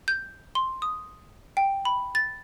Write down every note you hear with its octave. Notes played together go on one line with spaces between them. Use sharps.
G6
C6
D#6
G5
B5
A6